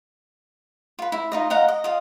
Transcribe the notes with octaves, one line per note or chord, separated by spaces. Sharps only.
F4 B4
E4
D#4 F4 D#5
D#5 F5 F#5 A#5
D#5
F4 D#5 F5